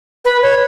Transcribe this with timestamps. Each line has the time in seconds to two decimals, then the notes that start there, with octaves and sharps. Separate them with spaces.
0.25 B4
0.42 C#5